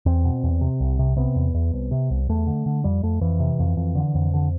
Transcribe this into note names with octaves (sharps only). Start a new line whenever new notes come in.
E2 C4
B2
E2
C3
C2
C3
C3 B3
E2
E2
C2
C3
C2
E2 A3
D3
D3
F2 G3
F2 A3
F2 E3
C3
F2
F2
D3
F2
D3